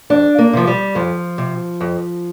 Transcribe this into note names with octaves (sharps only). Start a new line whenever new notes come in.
F2 D4
A#3
C3 F3
G3
F2 F3
C3
F2